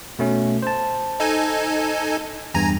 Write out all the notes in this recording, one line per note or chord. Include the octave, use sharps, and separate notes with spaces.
B2 A3 C#4
C5 A5
D#4 A4 G#5
E2 G2 G#5 A#5